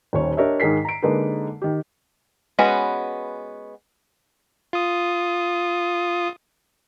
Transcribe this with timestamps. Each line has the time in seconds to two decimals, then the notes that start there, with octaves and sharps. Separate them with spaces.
0.13 D#1 D#2 C5 C#5
0.37 D4 G4 A#4 C#5 D#5 E5
0.60 G#2 D#3 G#4 A#4 B6 C7
0.85 A#5 D7
1.02 D3 G#3 A#3 D#4 A#4 B4
1.62 D#3 G4
2.59 G#3 B3 C#4 F#4 B4
4.73 F4 D#6